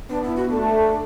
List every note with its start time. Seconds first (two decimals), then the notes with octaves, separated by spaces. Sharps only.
0.09 B3 D4
0.23 E4
0.36 F#4
0.49 A3 D4